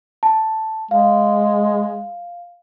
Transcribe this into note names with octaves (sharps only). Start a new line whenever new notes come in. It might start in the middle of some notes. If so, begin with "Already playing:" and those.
A5
G#3 F5